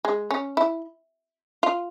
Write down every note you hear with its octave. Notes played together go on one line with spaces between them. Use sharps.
G#3
C#4
E4
F4